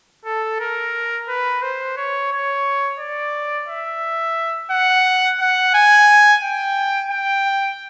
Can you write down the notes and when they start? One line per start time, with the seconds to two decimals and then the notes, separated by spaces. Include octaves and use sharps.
0.25 A4
0.60 A#4
1.28 B4
1.62 C5
1.97 C#5
2.32 C#5
2.99 D5
3.68 E5
4.71 F#5
5.40 F#5
5.74 G#5
6.43 G5
7.11 G5